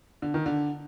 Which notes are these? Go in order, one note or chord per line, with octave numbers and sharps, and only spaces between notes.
D3
D#3
D3